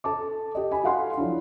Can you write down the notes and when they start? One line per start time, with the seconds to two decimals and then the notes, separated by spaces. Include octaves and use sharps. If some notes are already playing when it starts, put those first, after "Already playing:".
0.04 A4 A5 D6
0.55 G4 D#5
0.71 G#5 B5
0.83 F#4 A4 F5 F#5 G#5 C6
1.17 F3 F#3 D4 E4